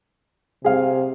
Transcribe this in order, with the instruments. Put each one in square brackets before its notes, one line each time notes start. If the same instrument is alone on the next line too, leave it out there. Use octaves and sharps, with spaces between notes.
[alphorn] C3 [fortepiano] G#4 F5